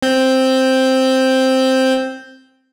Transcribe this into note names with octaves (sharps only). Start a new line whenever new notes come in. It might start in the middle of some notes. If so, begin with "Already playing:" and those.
C4 G6